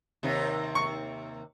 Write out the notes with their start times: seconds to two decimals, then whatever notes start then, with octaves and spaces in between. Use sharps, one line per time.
0.23 D#2 C3 D#4
0.75 C#6